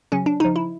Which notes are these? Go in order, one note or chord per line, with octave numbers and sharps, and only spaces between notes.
C#3 F#3 C#4
D4
C#3 F3 D#4
E4